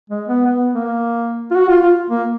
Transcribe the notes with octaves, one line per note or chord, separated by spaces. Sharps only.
G#3
B3
B3
A#3
F4
F#4
F4
F4
A#3